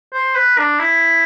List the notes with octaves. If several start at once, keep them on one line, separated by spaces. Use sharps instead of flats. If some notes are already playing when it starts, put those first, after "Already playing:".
C5
B4
D4
E4